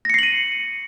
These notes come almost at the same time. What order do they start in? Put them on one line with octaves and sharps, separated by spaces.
A#6 C#7 C7 F#7 D#7